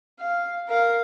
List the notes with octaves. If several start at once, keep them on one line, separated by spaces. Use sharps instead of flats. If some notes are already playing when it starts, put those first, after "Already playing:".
F5
A#4 F5